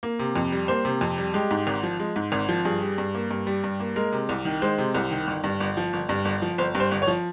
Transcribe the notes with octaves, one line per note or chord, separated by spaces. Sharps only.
A#3
C3
F2
G3
A#3 C5
C3
F2
G3
G#3 G4
G#2
G#1
F3
G#3
G#2
G#1
F3
G2 G#4
G3
G2
A#3
G2
G3
G2
A#3
G#3 A#4
C3
C2
D#3
G#3 C5
C3
C2
D#3
G1
G2
G1
F3
G1
G2
G1
F3
G1 C5
G2
C5
G1
C#5
F3